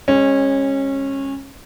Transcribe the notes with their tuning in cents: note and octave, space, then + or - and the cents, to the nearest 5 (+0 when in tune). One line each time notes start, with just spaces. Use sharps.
G#3 -35 C#4 -20